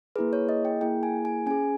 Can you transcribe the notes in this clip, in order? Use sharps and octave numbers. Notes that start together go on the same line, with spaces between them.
A#3 E4 G#4 B4
C#5
D#5
G5
A#3 E4 G#4 G5
G#5
G#5
C#4 G#4 G#5